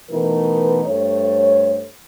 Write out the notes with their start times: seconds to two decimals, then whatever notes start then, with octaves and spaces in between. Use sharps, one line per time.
0.10 B2 E3 A3 D#4 A#4 B4
0.85 G2 A3 C5 C#5